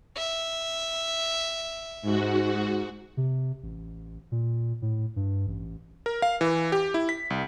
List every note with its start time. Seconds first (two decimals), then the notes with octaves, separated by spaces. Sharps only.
0.17 E5
2.02 G#2 F#4
3.17 C3
3.63 A1
4.32 A#2
4.82 A2
5.16 G2
5.47 A1
6.06 A#4
6.22 F5
6.41 E3
6.72 G4
6.94 E4
7.09 B6
7.30 C2